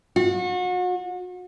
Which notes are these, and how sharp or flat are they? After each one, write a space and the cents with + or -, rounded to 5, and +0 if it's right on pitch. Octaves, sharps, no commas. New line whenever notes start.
F#4 -35